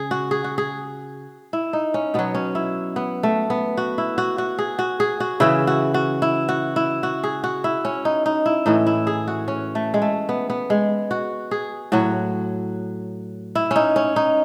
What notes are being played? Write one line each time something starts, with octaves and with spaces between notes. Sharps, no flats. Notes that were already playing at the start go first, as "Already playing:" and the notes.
Already playing: C#3 G#4
F#4
G#4
F#4
G#4
E4
D#4
C#4
B2 F#3 B3
C#4
E4
B3
A3
B3
F#4
E4
F#4
F#4
G#4
F#4
G#4
F#4
C#3 E3 E4
F#4
F#4
E4
F#4
E4
F#4
G#4
F#4
E4
C#4
D#4
D#4
E4
A2 E3 D#4
E4
G#4
F#4
C#4
A3
G#3
A3
B3
B3
G#3
F#4
G#4
A2 F#3 F#4
E4
C#4 D#4
C#4
D#4